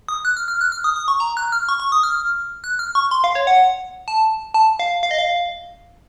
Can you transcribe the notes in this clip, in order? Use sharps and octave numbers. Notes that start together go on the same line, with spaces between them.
D#6
F#6
F6
F6
F#6
F6
D#6
D#6
C#6
A#5
F#6
F6
C#6
C#6
D#6
F6
F#6
F6
C#6
C6
F5
C#5
F#5
A5
A5
F5
F5
D#5
F5